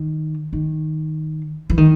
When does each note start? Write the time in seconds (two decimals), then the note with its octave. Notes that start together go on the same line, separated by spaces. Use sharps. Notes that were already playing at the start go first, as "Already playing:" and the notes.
Already playing: D#3
0.53 D#3
1.70 E3
1.77 D#3